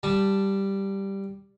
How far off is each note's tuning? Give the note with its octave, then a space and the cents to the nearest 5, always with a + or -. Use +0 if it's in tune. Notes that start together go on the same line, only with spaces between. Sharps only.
G3 +0 A5 +0